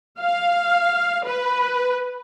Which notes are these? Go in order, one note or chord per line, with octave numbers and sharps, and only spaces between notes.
F5
B4